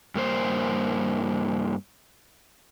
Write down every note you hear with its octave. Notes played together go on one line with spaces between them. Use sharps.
G2 A#3 C5